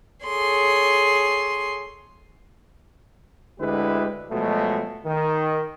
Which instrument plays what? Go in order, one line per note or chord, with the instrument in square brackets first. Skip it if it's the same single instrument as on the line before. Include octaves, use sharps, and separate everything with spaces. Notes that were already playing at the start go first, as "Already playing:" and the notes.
[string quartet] G#4 A4 C#5 C6
[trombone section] D2 D3 G#3 E4 G4 B4
B2 F3 F#3 G#3 A3
D#3